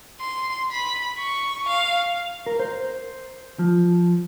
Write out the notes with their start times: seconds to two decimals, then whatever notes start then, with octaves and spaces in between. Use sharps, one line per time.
0.20 C6
0.71 B5
1.18 C#6
1.68 F5
2.46 A#4
2.60 C5
3.59 F3